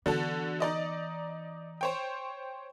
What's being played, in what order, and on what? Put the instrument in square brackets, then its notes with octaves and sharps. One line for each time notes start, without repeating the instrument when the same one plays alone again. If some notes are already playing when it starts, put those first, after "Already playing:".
[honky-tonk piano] D3 F#4 A4 [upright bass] E3 B3
[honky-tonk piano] D#4 D5 D#5
C5 C#5 G5